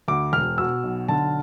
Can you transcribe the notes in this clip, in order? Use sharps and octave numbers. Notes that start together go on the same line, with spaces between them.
D2 D6
E1 F6
B2 E6
B1
D3 A5